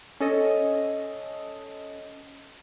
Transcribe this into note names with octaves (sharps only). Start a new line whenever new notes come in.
C#4 A4 D#5